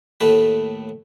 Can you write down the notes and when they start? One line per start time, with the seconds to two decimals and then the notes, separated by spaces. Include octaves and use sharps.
0.21 D#2 A2 A3 B4